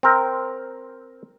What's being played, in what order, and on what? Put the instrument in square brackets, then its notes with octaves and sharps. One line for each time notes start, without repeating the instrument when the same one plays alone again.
[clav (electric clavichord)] C4 A#4